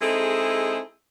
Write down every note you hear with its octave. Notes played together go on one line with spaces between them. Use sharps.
G#3 C4 D#4 E4 G#4 A4